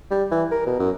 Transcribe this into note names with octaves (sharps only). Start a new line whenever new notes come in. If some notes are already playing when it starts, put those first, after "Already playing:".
G3
E3
A#4
B2
F#2